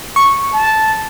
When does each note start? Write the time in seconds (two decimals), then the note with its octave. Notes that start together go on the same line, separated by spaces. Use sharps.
0.16 C#6
0.53 A5